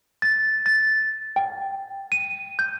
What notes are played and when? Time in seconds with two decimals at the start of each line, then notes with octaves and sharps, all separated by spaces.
0.22 A6
0.66 A6
1.36 G5
2.12 D#7
2.59 G6